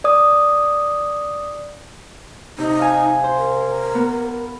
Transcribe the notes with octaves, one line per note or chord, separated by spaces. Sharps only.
D5 D#6
C3 D#4
F5 G#5
C5
A#4
B3